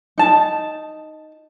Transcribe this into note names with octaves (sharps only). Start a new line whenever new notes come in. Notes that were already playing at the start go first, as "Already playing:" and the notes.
D#4 A5